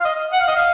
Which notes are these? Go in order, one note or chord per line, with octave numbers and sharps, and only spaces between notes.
F5
D#5
F#5
F5
D#5
F5